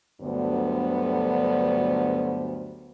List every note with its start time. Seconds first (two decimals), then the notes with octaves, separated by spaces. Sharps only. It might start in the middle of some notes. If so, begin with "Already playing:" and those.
0.21 D2 G2 D3 F#3 B3 C5